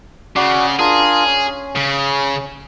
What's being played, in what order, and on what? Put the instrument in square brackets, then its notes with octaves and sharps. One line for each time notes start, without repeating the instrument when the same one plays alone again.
[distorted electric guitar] C#3 [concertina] F#4 D5
[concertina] D4 F4 A#4 [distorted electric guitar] G#4
[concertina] C#4
[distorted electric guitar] C#3